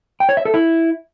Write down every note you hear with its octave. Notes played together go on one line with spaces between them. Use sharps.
G5
C#5
E5
A4
E4